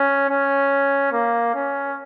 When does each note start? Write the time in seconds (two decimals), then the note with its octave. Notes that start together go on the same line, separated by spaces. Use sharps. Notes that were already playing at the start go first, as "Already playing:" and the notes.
Already playing: C#4
0.30 C#4
1.12 A#3
1.55 C#4